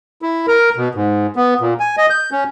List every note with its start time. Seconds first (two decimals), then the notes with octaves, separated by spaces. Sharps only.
0.22 E4
0.48 A#4
0.77 B2
0.95 G#2
1.36 B3
1.61 A#2
1.80 G#5
1.97 D#5
2.10 G6
2.32 C#4